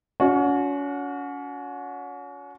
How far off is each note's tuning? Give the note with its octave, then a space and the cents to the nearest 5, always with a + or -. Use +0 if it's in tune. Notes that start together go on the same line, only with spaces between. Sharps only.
C#4 +35 F#4 -25